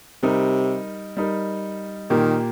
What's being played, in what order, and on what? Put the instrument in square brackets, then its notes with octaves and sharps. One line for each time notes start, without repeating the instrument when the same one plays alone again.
[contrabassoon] C3 [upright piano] G3 D#4 A#4
[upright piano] G3 D#4 A#4
[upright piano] A#2 A#3 G4 A#4 [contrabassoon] D#3